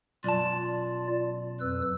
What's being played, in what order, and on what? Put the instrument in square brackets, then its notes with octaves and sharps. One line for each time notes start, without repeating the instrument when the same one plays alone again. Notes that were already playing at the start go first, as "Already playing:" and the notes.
[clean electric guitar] B1 F#2 A5 [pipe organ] F4 D5
[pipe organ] F2 B4 E6